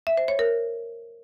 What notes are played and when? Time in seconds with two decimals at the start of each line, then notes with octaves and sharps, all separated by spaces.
0.07 E5
0.17 C5
0.28 C#5
0.39 A#4